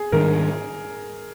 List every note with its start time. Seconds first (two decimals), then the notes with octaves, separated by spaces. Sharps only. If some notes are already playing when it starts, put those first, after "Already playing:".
Already playing: G#4
0.12 G#2 D#3 G3 D4 A#4